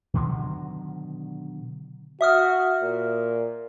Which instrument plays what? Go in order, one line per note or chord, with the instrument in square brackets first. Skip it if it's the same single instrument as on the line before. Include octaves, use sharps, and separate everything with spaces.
[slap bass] B2 D3 D#3 F#3
[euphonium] F#4 [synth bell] E5 D#6 F6
[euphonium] A#2